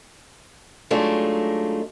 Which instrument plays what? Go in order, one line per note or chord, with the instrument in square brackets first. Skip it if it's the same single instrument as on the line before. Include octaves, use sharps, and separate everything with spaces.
[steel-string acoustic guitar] F#3 G#3 A3 D4 D#4 F4